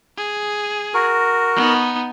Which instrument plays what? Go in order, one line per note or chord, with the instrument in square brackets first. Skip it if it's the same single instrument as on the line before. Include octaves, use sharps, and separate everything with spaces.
[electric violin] G#4
[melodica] F#4 A#4
[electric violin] B3 D#4